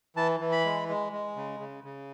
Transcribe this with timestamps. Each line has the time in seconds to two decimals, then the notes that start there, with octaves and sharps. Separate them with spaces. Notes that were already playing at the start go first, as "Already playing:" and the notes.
0.16 E3 A5
0.40 E3
0.52 B5
0.65 G#3
0.89 G#3
1.12 G#3
1.36 C#3
1.60 C#3
1.84 C#3